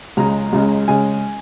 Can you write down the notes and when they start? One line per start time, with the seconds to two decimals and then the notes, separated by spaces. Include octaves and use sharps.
0.17 C#2 C#3 G#3 A#5
0.53 C#2 C#3 G#3
0.88 C#3 G#3 G#5